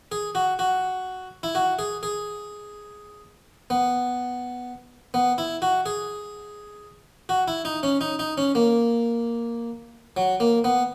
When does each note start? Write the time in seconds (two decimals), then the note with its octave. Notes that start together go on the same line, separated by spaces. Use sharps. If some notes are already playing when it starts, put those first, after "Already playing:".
0.12 G#4
0.35 F#4
0.59 F#4
1.43 E4
1.55 F#4
1.79 G#4
2.03 G#4
3.70 B3
5.14 B3
5.38 E4
5.62 F#4
5.86 G#4
7.29 F#4
7.48 E4
7.65 D#4
7.83 C#4
8.01 D#4
8.19 D#4
8.38 C#4
8.55 A#3
10.17 F#3
10.40 A#3
10.64 B3